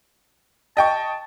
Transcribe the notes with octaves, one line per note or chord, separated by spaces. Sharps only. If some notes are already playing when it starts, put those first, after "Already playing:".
D#5 G5 A5 C#6